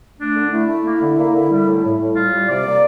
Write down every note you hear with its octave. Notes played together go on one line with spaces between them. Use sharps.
A3 D4
D3
A3 E4
A3
A#3
D3
A#3
D3
G3
A2
A2
A2
G3 F4
G3
C3 D5
A#3